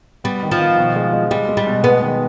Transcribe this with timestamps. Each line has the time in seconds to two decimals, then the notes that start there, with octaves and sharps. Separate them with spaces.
0.24 G3 B3
0.43 D#3
0.51 F3
0.60 D#3
0.78 B2
0.96 G#3
1.13 G#3
1.31 G3 G#3
1.49 G#3
1.57 G3
1.67 B2
1.84 G#3 B3
2.02 D#3